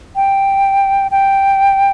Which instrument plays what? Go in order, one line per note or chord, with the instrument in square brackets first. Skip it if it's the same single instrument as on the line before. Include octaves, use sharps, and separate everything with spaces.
[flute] G5
G5